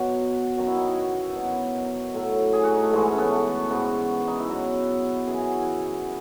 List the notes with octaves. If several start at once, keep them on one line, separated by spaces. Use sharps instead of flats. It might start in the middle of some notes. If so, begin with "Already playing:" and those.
Already playing: B2 F#3 F#4
F#2 D#3 F#3 F#4
E4
D#4
E4
F#4
B2 F#3
A2 F#3
G#4
F#4
D#4
A3
G#2 E3 G#3
A3
C#4
B3
A3
G#2 E3 F#4
D#4
E4
B2 F#3 F#4
F#2 E3 G#4
F#4
E4